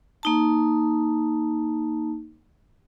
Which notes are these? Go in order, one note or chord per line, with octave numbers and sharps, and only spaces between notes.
A#3 D#4 A5